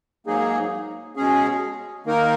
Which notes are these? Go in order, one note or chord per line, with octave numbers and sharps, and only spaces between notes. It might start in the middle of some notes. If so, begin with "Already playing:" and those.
G#2 F#3 A#3 D#4 G#4
B2 G#3 C#4 G#4
D#3 A#3 D#4 A#4